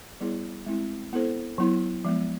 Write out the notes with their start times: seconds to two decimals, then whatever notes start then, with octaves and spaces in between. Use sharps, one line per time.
0.21 G3 B3 E4 G#4 C#5
0.66 G#3 C4 E4
1.13 B3 E4 A4 C5
1.58 F#3 B3 E4
2.05 F3 G#3 B3